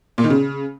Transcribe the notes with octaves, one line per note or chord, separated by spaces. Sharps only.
A#2
D#3
C#3